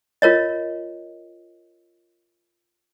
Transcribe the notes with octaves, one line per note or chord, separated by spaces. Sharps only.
F4 A#4 C#5 D#5